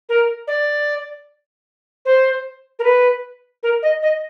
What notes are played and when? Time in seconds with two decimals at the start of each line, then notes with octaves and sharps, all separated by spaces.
0.09 A#4
0.47 D5
2.05 C5
2.79 A#4
2.84 B4
3.63 A#4
3.83 D#5
4.02 D#5